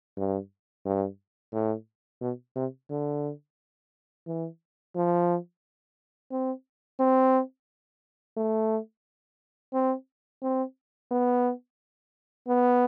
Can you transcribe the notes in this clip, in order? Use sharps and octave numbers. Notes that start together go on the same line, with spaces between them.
G2
G2
A2
B2
C3
D3
E3
F3
C4
C4
A3
C4
C4
B3
B3